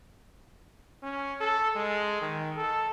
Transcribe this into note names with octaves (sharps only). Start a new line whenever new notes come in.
C#4
A4
G#3
D#3
A4